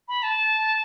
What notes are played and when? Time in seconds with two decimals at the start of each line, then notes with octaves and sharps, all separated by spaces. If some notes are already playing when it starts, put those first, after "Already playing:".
0.08 B5
0.23 A5